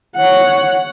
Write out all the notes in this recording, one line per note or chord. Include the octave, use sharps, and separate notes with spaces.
C#5 F#5